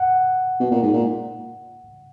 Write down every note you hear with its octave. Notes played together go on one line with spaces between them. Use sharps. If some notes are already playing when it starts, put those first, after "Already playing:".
Already playing: F#5
B2
A#2
G#2
A#2